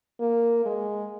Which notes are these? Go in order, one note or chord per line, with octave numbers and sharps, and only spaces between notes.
A#3
G#3